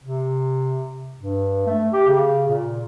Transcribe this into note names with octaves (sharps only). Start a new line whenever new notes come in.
C3
G2
A3
G4
C#3
A#2